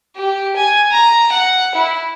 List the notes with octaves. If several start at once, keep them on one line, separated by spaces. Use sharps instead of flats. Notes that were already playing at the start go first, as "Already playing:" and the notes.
G4
G#5
A#5
F#5
E4